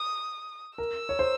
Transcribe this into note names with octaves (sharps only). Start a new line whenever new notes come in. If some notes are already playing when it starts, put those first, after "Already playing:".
Already playing: D#6
A#4 E6
C#5
C5